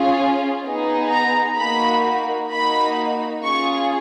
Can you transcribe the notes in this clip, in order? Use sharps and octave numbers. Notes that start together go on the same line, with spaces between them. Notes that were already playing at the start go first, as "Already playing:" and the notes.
Already playing: C#4 F4 G#4
B3 D#4 G#4
A#5
A#3 D#4 F#4 B5
A#3 D#4 F#4 B5
C#4 F4 G#4 C#6